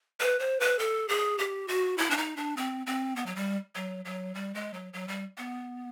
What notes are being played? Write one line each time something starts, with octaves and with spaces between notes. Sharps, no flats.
B4
C5
B4
A4
G#4
G4
F#4
E4
D4
D#4
D4
C4
C4
B3
F#3
G3
F#3
F#3
G3
G#3
F#3
F#3
G3
B3